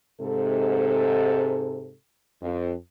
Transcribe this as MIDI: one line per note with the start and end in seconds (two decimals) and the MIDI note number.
0.21 1.94 44
0.21 1.94 48
0.21 1.94 69
2.42 2.74 41